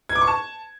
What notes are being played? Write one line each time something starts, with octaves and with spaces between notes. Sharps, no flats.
G#6
D6
C#6
A5